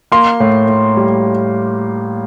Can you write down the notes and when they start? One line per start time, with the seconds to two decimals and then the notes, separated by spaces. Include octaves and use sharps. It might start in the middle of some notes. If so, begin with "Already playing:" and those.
0.12 A#3 C6
0.40 A2
0.68 A2
0.97 G3